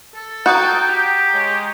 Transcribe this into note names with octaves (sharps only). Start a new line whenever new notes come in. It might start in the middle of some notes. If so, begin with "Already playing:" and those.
A4
F#4 G5 A#5 D#6 G6
G4
G#3 C#5